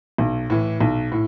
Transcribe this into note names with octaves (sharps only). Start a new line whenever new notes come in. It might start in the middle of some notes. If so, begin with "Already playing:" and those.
B1
A2 E3
B1
A2